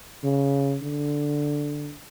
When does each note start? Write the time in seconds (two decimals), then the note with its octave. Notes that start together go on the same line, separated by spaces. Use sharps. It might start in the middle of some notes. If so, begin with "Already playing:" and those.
0.24 C#3
0.82 D3